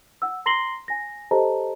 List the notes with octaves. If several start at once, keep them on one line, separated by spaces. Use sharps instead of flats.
F#5 E6
A#5 C6 A#6 C7 F#7 G7
G#5 A#6
G4 A4 C5 D#5 A5 A#5